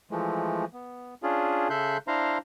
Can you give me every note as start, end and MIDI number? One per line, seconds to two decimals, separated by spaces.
0.11 0.65 52
0.11 0.65 53
0.11 0.65 56
0.11 0.65 57
0.73 1.14 59
1.23 1.68 61
1.23 1.68 62
1.23 1.68 65
1.23 1.68 68
1.70 1.97 49
1.70 1.97 69
1.70 1.97 76
1.70 1.97 84
1.70 1.97 90
1.70 1.97 91
2.08 2.38 62
2.08 2.38 64
2.08 2.38 72
2.08 2.38 77
2.08 2.38 82
2.08 2.38 84